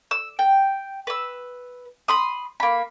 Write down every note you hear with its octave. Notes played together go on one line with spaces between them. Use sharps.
E6
G5
B4 E6
B5 C6 D#6
A#3 B5